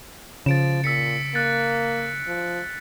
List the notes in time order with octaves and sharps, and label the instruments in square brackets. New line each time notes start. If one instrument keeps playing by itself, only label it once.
[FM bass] C#3 [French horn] F3 [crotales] A6 D7 E7
[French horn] A#2 [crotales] E6 B6 C#7
[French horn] A#3 [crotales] F#6 A6 C#7
[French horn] F3